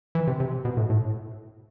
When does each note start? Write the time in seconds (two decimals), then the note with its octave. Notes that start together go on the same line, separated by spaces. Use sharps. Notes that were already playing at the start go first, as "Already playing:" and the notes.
0.15 E3
0.27 C3
0.40 C3
0.65 B2
0.77 A2
0.90 A2